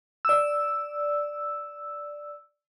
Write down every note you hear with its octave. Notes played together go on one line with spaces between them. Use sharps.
D5 E6